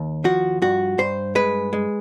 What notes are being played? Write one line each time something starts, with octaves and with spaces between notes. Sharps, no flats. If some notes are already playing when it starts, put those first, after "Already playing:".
Already playing: D#2
F3 F#4
G2 F#4
G2 C5
G#3 B4
G#3